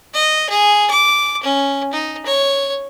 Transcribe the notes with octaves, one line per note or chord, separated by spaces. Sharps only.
D#5
G#4
D6
C#4
D#4
C#5